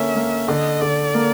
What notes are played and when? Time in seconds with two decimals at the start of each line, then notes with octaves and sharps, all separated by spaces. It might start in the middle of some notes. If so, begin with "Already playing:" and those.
Already playing: D3 A#3 C#4 E5
0.16 A#3
0.48 D3 D#5
0.81 D3 D5
1.14 A#3